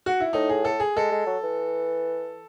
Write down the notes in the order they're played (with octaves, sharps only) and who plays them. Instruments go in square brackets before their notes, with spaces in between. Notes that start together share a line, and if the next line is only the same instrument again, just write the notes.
[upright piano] F#4
E4
[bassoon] A2 [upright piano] D#4
[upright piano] G#4
A4
G#4
[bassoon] G#3 [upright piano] A4
[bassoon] G#3
F#3
E3